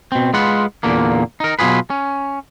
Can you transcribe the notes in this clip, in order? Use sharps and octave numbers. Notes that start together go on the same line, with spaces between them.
B2 C4
G#3 F4 B4 F#5
E2 A#2 D3 A#3
D#4 A#4
B2 F#3 F4 G#4 B4
C#4